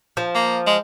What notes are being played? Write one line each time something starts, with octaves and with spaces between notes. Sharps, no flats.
F3
A#3
G#3